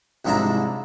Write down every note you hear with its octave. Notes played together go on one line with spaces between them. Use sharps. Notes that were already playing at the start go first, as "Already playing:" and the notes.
C2 G#2 F3 D4 E4 A#5